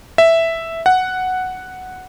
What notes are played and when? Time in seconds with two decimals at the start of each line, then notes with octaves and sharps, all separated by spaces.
0.18 E5
0.86 F#5